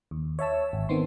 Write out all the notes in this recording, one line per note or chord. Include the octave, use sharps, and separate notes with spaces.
D#2
C#5 E5 A5 E6
G#1
D#3 B3 C4 C6